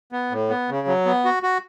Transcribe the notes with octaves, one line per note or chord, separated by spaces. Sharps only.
B3
A2
B3
C#3
F#3
B3
F#4
F#4